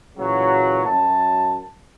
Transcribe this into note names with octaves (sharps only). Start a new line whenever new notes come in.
A#2 C#3 E3 F#3
F#2 A5